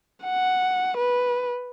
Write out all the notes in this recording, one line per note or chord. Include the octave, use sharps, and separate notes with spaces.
F#5
B4